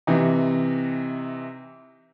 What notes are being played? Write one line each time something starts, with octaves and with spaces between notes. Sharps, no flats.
C3 E3 D#4